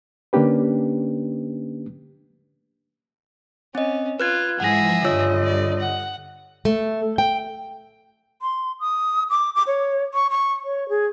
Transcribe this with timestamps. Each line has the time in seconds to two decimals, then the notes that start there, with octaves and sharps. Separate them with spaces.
0.33 D3 A#3 C#4 D4 G4 B4
3.75 C4 C#4 D#5
4.20 F4 B4 F#6 G#6
4.60 G#2 E3 F3 G#4 E5 F#5 A#6
5.04 G2 D3 F4 C#5 D#5 E6
5.43 D5
5.80 F#5
6.65 A3
7.18 G5
8.42 C6
8.80 D#6
9.30 D6
9.55 D6
9.67 C#5
10.14 C#6
10.30 C#6
10.64 C#5
10.89 G#4